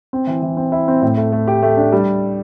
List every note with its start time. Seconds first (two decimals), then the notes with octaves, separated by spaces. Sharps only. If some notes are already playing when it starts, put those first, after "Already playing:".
0.13 C4
0.27 E3
0.42 E3
0.57 C4
0.72 E4
0.88 C4
1.02 A2
1.17 A3
1.32 A3
1.47 G4
1.63 A3
1.77 D4
1.92 G3